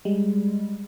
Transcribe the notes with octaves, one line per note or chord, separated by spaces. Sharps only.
G3 G#3